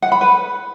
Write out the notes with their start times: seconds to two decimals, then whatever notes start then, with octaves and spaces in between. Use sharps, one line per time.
0.02 F#5
0.12 B5
0.21 B4